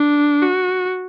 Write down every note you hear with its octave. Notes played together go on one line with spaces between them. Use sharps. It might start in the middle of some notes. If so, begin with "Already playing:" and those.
Already playing: D4
F#4